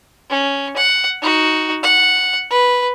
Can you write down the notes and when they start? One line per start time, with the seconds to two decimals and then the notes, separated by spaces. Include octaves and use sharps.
0.30 C#4
0.76 F#5
1.21 D#4 F#4
1.83 F#5
2.50 B4